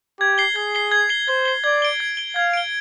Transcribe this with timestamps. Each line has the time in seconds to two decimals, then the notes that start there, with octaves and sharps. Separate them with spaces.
0.20 G4 G#6
0.38 C7 G7
0.56 G#4 G#6
0.75 C7 G7
0.91 G#6
1.09 C7 G7
1.28 C5 G#6
1.45 C7 G7
1.64 D5 G#6
1.82 D7 G7
2.00 G#6
2.17 D7 G7
2.36 F5 G#6
2.54 D7 G7